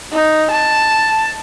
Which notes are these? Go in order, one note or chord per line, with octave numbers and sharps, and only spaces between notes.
D#4
A5